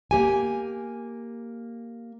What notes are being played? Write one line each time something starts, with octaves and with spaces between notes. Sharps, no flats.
A#3 G4 G#5